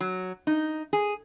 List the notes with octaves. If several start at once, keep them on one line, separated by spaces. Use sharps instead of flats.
F#3
D#4
G#4